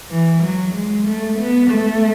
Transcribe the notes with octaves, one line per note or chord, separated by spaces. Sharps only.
E3
F#3
G#3
A3
B3
A3